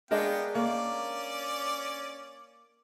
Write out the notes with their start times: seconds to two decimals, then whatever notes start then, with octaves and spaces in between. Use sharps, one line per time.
0.11 G#3 B3 D4 A#4 F5 G5
0.55 A#3 C#4 D5